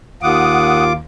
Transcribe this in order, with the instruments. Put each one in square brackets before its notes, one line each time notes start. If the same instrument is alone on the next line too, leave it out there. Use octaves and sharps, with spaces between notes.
[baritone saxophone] D#2 [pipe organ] F4 D6 [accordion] F#5 D#6